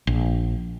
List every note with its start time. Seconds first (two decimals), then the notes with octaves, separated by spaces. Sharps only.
0.07 A#1